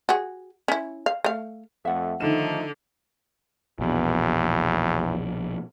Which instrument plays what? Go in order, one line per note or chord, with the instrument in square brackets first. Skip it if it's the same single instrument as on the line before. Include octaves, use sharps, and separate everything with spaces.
[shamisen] F#4 G#4
C#4 E4
F5
A3 F5
[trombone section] F2 A3 [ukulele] E5 F#5
[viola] D3 [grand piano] D#3 E7 [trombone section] F3 A3 D#4
[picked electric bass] A#1 B2 [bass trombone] E2